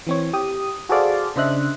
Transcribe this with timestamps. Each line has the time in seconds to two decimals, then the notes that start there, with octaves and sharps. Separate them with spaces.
0.07 E3 C4 C#5
0.33 G4 D#6
0.89 F#4 G#4 A4 C5 D5 F5
1.36 C#3 D4 C5 D#5 E5 F#6